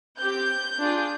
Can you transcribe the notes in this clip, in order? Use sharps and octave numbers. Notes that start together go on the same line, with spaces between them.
C4 G4 G6
D4 F4 G#4